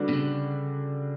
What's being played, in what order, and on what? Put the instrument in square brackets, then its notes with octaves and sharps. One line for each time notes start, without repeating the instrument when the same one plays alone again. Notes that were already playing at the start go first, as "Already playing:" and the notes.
Already playing: [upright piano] D3 G3 D4 F#4 B4
[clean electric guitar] B2
C#3